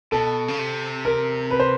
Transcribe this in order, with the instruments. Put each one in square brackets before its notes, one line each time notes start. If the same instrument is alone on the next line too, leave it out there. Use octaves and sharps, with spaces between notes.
[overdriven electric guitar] B2 [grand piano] A4
[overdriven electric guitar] C#3
C3
[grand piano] A#4
B4
C5